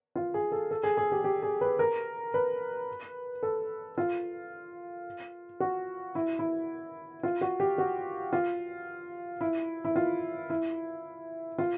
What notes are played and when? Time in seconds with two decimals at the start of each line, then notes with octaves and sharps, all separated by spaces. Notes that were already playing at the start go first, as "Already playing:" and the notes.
0.16 F4
0.34 G#4
0.52 A4
0.71 A4
0.83 G#4
0.97 G#4
1.12 G4
1.24 G4
1.43 G#4
1.61 B4
1.79 A#4
2.34 B4
3.43 A4
3.98 F4
5.60 F#4
6.15 E4
6.39 E4
7.23 F4
7.41 F#4
7.60 G4
7.78 F#4
8.33 F4
9.41 E4
9.85 E4
9.96 F4
10.50 E4
11.58 F4